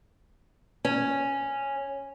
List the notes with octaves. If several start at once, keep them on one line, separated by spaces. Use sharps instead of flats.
C#4